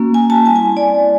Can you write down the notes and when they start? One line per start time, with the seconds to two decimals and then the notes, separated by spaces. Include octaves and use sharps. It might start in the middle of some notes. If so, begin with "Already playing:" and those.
Already playing: A#3 C#4 F#4
0.14 G#5
0.30 A5
0.45 G3 C4 E4 G#5
0.56 G#5
0.77 D5